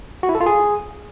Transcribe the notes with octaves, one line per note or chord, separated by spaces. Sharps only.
F#4
E4
A4
F4
G#4